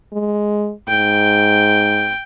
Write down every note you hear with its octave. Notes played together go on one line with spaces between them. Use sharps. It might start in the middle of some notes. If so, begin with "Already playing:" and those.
G#3
G#2 G5